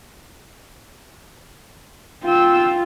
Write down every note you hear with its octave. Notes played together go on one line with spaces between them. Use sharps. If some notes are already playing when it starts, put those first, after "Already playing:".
F4 G5 E6